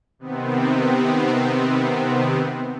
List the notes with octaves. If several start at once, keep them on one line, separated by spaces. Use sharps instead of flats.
C3 D#3 B3 C4